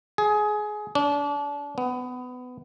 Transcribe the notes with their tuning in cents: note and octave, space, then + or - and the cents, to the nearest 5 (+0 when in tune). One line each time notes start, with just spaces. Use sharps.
G#4 +20
D4 -35
B3 +20